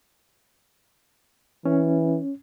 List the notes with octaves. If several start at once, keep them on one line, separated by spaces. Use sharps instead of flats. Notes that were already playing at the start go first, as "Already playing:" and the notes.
E3 C#4